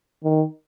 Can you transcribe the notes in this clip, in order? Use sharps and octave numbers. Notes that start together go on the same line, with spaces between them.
D#3